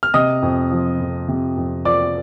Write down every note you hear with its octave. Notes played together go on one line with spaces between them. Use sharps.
F6
C3 D#5 D#6
F2
F3
F2
C3
F2
F3 D5 D6